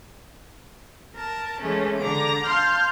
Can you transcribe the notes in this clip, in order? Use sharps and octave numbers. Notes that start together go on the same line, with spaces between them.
A#4 A5
E3 G#3 A3 C#4
D3 A#5 D6
F5 A5 C6 F6 G6